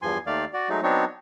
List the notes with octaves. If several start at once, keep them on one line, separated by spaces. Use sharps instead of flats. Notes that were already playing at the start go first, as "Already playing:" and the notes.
E2 G2 F3 G#5 C6
D#2 D#3 A3 D5 F5
F#4 D5
F#3 G#3 A3 D#4
F#3 B3 C4 D4 D#4 C#5